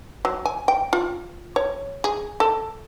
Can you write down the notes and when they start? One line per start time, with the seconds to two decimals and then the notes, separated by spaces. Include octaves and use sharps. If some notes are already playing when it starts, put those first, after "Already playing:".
0.25 F#3
0.45 G#5
0.68 G5
0.93 F4
1.56 C#5
2.04 G#4
2.40 A4